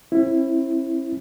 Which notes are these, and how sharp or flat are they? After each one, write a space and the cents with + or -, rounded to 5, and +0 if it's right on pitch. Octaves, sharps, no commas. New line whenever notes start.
C4 +45 E4 +0